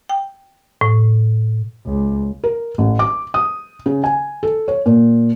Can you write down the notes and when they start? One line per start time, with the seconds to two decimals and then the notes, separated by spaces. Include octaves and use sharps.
0.09 G5
0.81 A2
1.86 C#2
2.43 A#4
2.78 A1
2.99 D6
3.34 D#6
3.86 C#3
4.04 G#5
4.43 A4
4.68 C#5
4.86 A#2